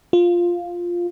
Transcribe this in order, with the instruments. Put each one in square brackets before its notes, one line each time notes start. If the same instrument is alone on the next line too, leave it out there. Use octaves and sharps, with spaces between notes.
[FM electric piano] F4